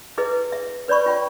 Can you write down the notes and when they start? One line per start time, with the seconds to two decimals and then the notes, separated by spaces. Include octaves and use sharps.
0.18 E4 G#4 B4 D#5
0.52 E5
0.88 B4 C#5 D5 B5 C#6
1.06 F4 G5